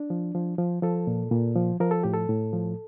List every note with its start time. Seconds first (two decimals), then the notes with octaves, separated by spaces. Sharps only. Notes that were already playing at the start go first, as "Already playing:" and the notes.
Already playing: D4
0.10 F3
0.35 F3
0.58 F3
0.83 F3 A4
1.07 A#2
1.32 A#2
1.55 F3
1.80 F3 A#4
1.91 A4
2.03 A2 G4
2.13 A4
2.29 A2
2.53 F3